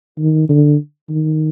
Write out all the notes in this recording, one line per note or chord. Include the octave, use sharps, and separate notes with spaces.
D#3
D3
D#3